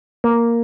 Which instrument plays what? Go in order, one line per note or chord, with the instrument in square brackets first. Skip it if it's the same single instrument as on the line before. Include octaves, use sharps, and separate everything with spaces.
[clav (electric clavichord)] A#3